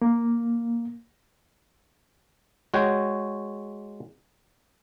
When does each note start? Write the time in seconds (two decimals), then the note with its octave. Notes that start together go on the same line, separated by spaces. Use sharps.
0.02 A#3
2.74 G#3 F#4 C#5 G5